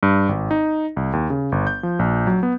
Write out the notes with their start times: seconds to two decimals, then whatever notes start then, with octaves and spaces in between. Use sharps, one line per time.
0.03 G2
0.29 G#1
0.51 D#4
0.97 C2
1.13 D#2
1.30 C#3
1.52 G1
1.67 G6
1.83 F3
1.99 A#1
2.27 F#3
2.43 B3